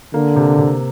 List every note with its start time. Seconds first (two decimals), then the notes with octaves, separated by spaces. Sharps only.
0.14 D3 A#3
0.36 C3
0.58 C3